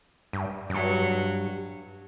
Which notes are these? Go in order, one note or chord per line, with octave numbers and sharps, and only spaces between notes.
G2
F#2
G2 F#3